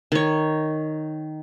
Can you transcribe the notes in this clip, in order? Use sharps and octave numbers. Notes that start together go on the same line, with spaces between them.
D#3 C#5